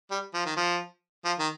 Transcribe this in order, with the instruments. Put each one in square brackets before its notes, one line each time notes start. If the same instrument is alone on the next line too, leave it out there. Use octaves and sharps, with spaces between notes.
[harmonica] G3
F3
D#3
F3
F3
D#3